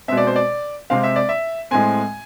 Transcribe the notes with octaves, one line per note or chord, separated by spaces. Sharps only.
B2 G#3 C4 E5
D5
C5
D5
C3 G#3 C4 F5
E5
D5
E5
A2 G#3 C4 G#5